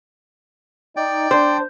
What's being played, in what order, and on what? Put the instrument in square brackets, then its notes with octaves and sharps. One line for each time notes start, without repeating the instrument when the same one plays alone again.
[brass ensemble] D#4 [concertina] D5 G5
[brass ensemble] D4 [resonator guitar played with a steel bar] C5